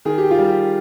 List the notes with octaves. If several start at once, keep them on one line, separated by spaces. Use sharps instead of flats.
D#3 G#4
G4
F4
G3
G4